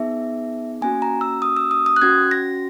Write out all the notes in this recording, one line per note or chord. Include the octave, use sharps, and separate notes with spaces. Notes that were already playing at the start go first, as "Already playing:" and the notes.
Already playing: B3 D#4 G#4 E5
A#3 C#4 F#4 G#5
A#5
E6
D#6
E6
D#6
D#6
F#6
C#4 F#4 G#6
A#6